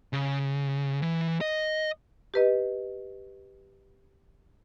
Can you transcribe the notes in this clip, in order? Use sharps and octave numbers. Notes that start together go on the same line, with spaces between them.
C#3
E3
D#5
G4 B4 D#5